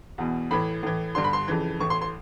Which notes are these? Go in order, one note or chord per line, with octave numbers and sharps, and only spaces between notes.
E2 B2
A2 E3 B5
A2 E3
G2 D3 C6
B5
C6
F2 C#3 E3
A2 E3 C#6
C6
C6